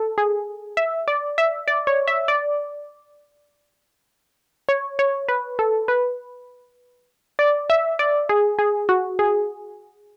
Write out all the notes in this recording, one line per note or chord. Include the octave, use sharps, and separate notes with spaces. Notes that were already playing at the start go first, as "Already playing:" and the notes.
Already playing: A4
G#4
E5
D5
E5
D5
C#5
E5
D5
C#5
C#5
B4
A4
B4
D5
E5
D5
G#4
G#4
F#4
G#4